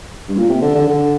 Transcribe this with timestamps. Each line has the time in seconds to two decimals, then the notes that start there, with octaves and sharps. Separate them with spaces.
0.28 G2
0.37 A#2
0.49 C3
0.62 D3
0.75 D3
0.87 D3